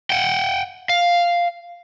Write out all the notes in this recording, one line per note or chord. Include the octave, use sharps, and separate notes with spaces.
F#5 G5
F5